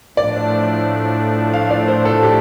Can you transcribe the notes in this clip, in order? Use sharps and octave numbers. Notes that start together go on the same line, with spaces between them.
A2 F3 A3 D4 D5
F5
D5
C5
A4
G4